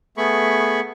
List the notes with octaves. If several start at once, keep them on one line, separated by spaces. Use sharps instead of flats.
A3 B3 G#4 B5 C#6